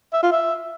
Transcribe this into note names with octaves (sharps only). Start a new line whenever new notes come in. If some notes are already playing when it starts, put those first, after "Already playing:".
E5
F4
E5